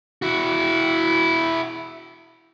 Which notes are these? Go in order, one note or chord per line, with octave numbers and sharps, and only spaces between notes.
E4 F#4